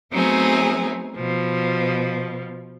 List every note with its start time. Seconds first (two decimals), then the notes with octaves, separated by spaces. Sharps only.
0.12 F#3 A3 B3 C4 D#4 G#4
1.16 B2 F3